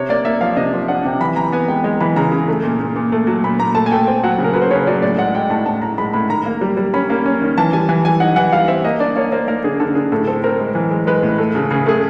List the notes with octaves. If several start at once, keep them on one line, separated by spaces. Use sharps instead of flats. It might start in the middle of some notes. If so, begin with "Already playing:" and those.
Already playing: C3 C#5
A#3 D5
A#3 E5
F3 F5
C3 D#5
F3
D4 F#5
C3 G5
E3 B5
E3 A#5
B3 G#5
G#3 G5
G#3 G5
E3 B5
C#3 A#5
C#3
A3
A#2
A#2
A#2
A3
F#3
A#2 B5
A#2 A#5
A3 A5
G#5
A3 G5
C4 G5
F#3 F#5
C#3
A#4
F#3 B4
C5
C#3 C#5
F#3 D5
A2 D5
G#3 F#5
G#3 G5
A2 A5
A2 A5
A2 A#5
G#3 B5
A2 B5
D#3 A#5
A#3
G3
G3
C#4 B5
A#3
C#4
D#3
E3 A5
G3 G#5
E3 G#5
G3 G#5
D#4 F#5
E3 F#5
G3 F5
C4 E5
A#3 D#5
D4 D5
A#3 C#5
A#3 C5
A#3 A#4
D3 G#4
D3 A4
D3 G#4
A2 A4
C4 A4
C4 A#4
G#3
E3
G#3
G#3 B4
A2
A3
C#3
C#3 G#4
A3 G#4